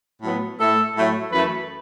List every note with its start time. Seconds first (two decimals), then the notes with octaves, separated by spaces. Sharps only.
0.22 A2 F#3 B3
0.59 A2 A3 A4
0.95 A2 F#3 A3
1.32 F#2 E3 A3 B4